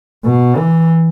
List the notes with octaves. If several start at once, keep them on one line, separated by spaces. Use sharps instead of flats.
B2
E3